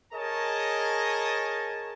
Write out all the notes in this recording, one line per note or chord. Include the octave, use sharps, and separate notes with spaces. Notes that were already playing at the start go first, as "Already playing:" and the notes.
G#4 A#4 C#5 D#5 A5